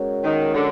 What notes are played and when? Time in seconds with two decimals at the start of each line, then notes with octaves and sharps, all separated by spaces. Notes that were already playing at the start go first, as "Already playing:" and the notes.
Already playing: G#3 C#4 F#4 A#4 C#5
0.24 D#3
0.54 D3